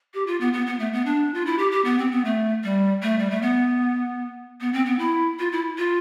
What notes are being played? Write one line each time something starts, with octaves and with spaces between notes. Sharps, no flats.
G4
F4
B3
B3
B3
A3
B3
D4
F4
E4
G4
G4
B3
C4
B3
A3
G3
A3
G3
A3
B3
B3
C4
B3
E4
F4
E4
F4